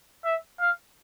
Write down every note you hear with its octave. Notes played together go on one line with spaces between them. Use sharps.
E5
F5